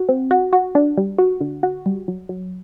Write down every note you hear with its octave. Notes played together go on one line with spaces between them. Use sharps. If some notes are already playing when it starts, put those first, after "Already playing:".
Already playing: F#4
C4
F#4
F#4
D4
G3
F#4
D3
F#4
G3
F#3
F#3